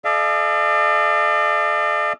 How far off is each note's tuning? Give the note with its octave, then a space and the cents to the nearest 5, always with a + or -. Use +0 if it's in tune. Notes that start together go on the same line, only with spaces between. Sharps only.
A4 -45 D5 +40 F5 -40